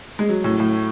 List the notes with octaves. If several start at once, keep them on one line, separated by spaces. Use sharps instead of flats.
G#3
F#3
A2
A2